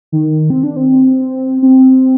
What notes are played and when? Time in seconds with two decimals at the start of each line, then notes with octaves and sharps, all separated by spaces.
0.12 D#3
0.50 C4
0.63 D4
0.77 C4
1.63 C4